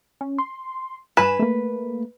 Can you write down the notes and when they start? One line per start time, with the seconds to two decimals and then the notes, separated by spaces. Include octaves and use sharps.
0.21 C#4
0.38 C6
1.17 G2 B4 G#5 E7
1.39 A3 A#3